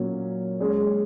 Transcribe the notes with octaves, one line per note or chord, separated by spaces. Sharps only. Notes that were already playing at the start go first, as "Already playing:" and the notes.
Already playing: A#2 F#3 A#3 C#4
G#3 C#4 G#4